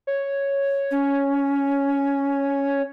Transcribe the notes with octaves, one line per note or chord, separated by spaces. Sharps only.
C#5
C#4